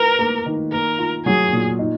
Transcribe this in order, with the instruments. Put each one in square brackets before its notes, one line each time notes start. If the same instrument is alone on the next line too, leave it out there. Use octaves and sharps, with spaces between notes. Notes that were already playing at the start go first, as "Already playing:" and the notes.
Already playing: [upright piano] F4 B4 [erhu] A#4
[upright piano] A#3
D#3
[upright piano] A#3 [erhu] A#4
[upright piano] F4
[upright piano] F#3 [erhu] G#4
[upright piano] A#2
D#4